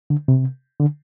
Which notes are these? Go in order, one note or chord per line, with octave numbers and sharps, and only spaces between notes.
D3
C3
D3